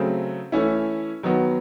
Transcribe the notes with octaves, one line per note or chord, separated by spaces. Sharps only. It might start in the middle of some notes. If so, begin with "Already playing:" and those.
Already playing: C#3 F#3 A3 C4
E3 A3 C#4 E4
D#3 F#3 B3